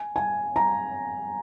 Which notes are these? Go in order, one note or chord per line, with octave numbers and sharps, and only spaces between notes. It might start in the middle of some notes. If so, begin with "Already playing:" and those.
Already playing: G#5
G#5
A#5